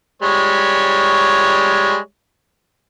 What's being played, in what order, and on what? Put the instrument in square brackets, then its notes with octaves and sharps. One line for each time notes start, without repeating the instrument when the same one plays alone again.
[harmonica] G3 G#3 C#5